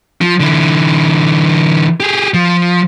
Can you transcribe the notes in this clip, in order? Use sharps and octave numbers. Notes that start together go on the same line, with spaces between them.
F3
D3 E3
G4 G#4
F3